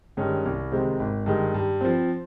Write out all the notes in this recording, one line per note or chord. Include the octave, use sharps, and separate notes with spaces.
G2 D#3 G#3 C#4
C2
C3 D#3 G#3 C4
G#1
G2 D#3 G#3
G2
F3 C4